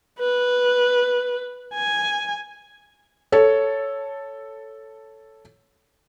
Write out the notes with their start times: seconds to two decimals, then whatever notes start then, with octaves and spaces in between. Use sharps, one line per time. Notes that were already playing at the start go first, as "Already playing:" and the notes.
0.20 B4
1.74 G#5
3.32 A4 C#5